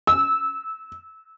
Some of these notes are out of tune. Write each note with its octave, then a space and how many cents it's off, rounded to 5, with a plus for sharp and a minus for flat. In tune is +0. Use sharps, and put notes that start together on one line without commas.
E6 -20